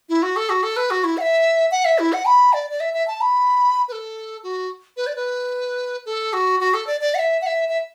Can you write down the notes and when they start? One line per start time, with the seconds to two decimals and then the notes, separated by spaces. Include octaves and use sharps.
0.09 E4
0.22 F#4
0.36 A4
0.49 F#4
0.63 A4
0.76 B4
0.90 F#4
1.04 E4
1.17 F#5
1.21 E5
1.71 F#5
1.85 E5
1.99 E4
2.13 F#5
2.26 B5
2.53 D5
2.70 D5
2.80 E5
2.94 E5
3.08 A5
3.21 B5
3.88 B4
3.92 A4
4.43 F#4
4.97 B4
5.07 D5
5.16 B4
6.06 A4
6.33 F#4
6.60 F#4
6.74 A4
6.87 D5
7.01 D5
7.14 F#5
7.19 E5
7.41 F#5
7.46 E5
7.69 E5